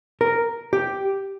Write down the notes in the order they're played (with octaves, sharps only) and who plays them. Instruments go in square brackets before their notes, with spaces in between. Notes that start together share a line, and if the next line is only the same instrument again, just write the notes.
[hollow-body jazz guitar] A#4
G4